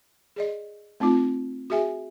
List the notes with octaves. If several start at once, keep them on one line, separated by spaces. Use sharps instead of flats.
G#4 D5 D#5
A3 C4 D#4 F4
F#4 G#4 E5 G#5